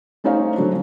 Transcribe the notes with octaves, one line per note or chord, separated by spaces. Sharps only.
A3 C#4 D#4 C5 C#5 F5
D3 F#3 D4